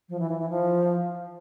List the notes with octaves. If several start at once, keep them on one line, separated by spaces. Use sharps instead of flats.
F3
E3
E3
E3
F3